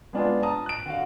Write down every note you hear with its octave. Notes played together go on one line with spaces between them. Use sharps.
G#3 B3 D4 F4 G#4
A5 A#5 D#6
F#6 D7
D3 F#4 F5